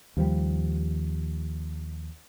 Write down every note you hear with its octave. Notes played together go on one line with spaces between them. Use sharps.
D#2 F3 G3